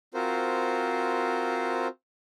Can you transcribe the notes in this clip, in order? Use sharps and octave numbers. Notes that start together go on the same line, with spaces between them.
C4 F4 F#4 A#4 C5